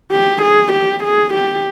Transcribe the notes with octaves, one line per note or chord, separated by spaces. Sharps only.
G4
G#4
G4
G#4
G4